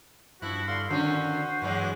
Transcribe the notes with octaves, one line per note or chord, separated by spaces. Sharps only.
G2 F3 E4 F#4 F#6
D3 F5 C6
D3 D#3 C#4 F#4 C5
G2 E3 F#3 G#3